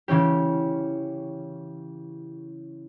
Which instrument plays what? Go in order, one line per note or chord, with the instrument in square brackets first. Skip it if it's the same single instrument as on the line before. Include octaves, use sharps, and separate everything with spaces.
[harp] C#3 E3 C#4 G4